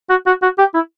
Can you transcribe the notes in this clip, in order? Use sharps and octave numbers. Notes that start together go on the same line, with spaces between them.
F#4
F#4
F#4
G4
E4